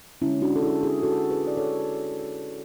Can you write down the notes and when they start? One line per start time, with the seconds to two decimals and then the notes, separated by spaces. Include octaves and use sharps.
0.22 D3 G#3 C#4 E4
0.42 D4 F#4
0.56 A4
0.63 E4 G#4
0.83 E4 G#4
1.03 F#4 A4
1.30 G#4 B4
1.47 D5
1.57 A4 C#5